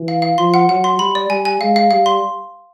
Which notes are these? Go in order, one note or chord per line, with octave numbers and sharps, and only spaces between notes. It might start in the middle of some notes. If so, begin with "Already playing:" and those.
Already playing: E3
F5
F5
F3 C6
F#5
F#3 F#5
C6
G3 B5
D5
G3 G#5
G#5
G#3 F5
F5
G3 F5
C6